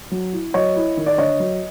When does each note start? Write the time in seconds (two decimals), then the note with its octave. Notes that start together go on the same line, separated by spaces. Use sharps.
0.11 F#3
0.33 E4
0.54 F#3 C#5 D#5
0.76 E4
0.97 D#3
1.06 D5
1.18 D3 C#5 D#5
1.40 F#3